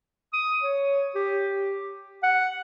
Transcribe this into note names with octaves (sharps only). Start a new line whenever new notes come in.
D#6
C#5
G4
F#5